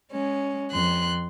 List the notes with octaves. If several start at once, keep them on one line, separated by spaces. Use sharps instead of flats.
G#3 C#4
F2 C6 F#6